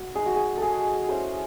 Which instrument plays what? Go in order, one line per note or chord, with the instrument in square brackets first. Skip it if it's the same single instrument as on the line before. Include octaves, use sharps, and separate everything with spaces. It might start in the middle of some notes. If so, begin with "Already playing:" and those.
Already playing: [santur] F#4
G#3 D#4 G#4
F#4
G#4
G#4 A4
A3 C#4 E4 G#4 C5